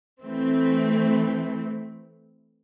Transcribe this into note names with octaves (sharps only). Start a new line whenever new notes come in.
E3 A3 C4